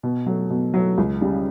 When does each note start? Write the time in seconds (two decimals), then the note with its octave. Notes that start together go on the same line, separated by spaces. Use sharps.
0.03 B2
0.26 F#3 A3
0.50 B2
0.74 F#3 A3
0.98 C#2
1.21 C#3 G3